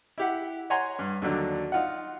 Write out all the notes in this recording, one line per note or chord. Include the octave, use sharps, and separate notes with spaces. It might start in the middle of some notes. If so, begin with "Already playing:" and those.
E4 G4 F#5
C#5 F#5 G#5 A#5 C6
G2
D#2 D3 F#3 D4
D#4 F4 F#5